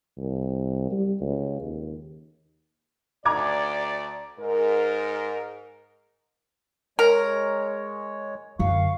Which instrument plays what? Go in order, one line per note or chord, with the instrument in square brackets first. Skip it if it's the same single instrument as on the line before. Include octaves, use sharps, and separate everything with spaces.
[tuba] C2
G3
C#2
D#2
[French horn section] D2 D5 [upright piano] A#5 D6 G#6
[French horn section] G#2 A#4
[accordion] G#3 C#5 [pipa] A#4
[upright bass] F#2 D3 [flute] F5 [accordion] C#6